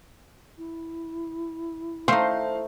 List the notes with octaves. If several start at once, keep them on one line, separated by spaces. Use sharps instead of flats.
E4
A3 D#4 C5 F5